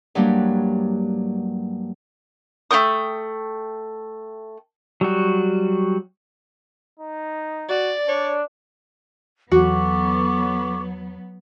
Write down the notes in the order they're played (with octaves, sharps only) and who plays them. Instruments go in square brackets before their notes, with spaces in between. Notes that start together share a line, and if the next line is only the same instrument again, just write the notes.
[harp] G2 F#3 G3 A#3 D4
[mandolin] A3 F#4 G5 D#6
[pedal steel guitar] F#3 G3 F#4
[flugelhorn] D#4
[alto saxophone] F#4 [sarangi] D5
[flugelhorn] D4 [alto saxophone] C#5
[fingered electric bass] E2 [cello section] F#3 B3 [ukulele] F#4 [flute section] A4 C#6 D6